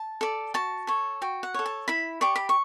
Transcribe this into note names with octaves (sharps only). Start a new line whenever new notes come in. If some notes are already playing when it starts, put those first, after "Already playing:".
Already playing: A5
A4 D5
F#4 A5
A4 C#5
F#4 G5
F#5
A4 C#5
A5
E4 B5
G4 D5 C#6
B5
C#6